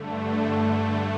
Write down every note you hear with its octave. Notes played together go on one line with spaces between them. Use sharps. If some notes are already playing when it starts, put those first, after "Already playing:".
Already playing: G2 D3 A3